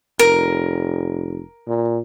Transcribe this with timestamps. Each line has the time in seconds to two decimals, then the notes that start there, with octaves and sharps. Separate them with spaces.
0.19 F1 A#4
1.67 A#2